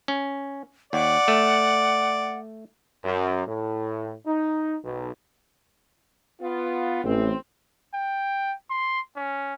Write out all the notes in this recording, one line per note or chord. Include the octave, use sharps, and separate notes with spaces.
C#4
D#2 D5 F#5
A3
F#2
A2
D#4
B1
B3 F4
A1 C4
G5
C6
C#4